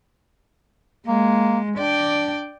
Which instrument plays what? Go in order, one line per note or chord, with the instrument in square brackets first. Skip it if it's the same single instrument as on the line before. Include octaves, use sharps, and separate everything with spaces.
[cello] G#3 [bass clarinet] A#3
[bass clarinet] D4 [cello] D5 G5